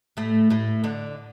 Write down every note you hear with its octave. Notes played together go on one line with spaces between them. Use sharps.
A2 A3
A2 A3
D3 D4